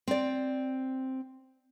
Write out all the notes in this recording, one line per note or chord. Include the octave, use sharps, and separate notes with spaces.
C4 D5